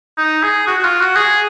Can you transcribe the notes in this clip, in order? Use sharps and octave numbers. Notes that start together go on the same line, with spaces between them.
D#4
G#4
F#4
F#4
F4
F#4
G#4